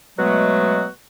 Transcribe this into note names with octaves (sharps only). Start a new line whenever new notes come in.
B2 F#3 G#3 A3 B3 F#4